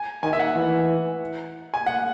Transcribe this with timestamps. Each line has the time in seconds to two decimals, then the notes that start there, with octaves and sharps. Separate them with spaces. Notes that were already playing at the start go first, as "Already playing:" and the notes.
Already playing: G#5
0.23 D#3 G#5
0.33 E5
0.39 F#5
0.56 E3
1.74 G#5
1.86 F#5